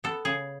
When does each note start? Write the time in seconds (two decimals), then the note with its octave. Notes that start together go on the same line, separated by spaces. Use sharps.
0.04 B3 A4
0.25 C#3 G#4